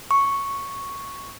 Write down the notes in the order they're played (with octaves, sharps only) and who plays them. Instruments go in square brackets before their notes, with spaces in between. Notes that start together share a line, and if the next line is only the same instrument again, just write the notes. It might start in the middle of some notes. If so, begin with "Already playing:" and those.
[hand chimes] C#6